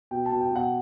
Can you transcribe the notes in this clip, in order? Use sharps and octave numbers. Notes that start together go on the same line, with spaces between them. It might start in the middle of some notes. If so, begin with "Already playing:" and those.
B2 G5
B2 A5
G5
B2 F#5